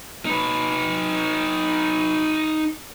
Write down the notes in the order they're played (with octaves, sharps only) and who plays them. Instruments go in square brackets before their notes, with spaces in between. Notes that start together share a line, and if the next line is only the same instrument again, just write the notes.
[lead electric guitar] D#4 B4